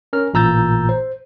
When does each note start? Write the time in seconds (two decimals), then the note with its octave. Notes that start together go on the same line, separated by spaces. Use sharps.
0.13 C#4 A#4 F6
0.34 A1 A#2 A#5 E6 G6 A6
0.89 C5